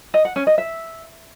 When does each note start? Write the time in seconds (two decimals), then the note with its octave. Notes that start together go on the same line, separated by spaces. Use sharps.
0.14 D#5
0.25 F#5
0.36 C#4
0.47 D#5
0.58 E5